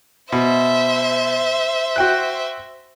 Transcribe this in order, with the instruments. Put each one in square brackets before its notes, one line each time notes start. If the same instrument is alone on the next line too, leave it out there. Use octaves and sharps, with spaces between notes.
[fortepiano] B2 [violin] C5 E5
[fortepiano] F#4 G5 F#6